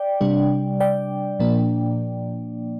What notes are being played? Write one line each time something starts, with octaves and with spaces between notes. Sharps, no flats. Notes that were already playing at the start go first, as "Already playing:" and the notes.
Already playing: D5 G5
C3 G3 D4
D5 G5
A#2 F3 A#3 D4